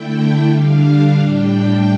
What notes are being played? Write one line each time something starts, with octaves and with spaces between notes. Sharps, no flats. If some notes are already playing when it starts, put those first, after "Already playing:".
Already playing: D3 A3 E4 G5
D3 G3 D4 F5
A2 G3 D4 G5